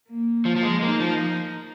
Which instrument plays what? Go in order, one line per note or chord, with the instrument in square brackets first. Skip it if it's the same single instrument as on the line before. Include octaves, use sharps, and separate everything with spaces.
[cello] A#3
[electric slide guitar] F3
F3
G#3
[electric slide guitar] A#3 [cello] D#4
[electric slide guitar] F3